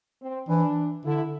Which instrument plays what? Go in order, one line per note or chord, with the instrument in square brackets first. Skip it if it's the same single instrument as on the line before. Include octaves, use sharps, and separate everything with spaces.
[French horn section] C4
[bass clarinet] E3 [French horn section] D4
[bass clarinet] D3 [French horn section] E4